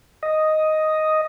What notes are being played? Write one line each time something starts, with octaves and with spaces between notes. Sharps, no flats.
D#5